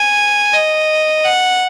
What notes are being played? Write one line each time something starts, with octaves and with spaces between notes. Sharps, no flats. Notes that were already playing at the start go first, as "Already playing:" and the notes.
Already playing: G#5
D#5
F#5